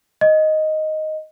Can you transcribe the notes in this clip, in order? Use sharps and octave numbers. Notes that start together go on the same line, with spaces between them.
D#5